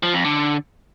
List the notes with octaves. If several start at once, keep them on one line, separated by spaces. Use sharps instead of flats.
F3
F2
D3